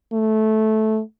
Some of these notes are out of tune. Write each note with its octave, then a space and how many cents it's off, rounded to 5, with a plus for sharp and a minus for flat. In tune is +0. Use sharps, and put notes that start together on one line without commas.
A3 -15